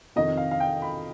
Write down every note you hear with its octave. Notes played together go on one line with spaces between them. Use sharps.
F2 C3 D#3 D#5
F5
F5
G5
B5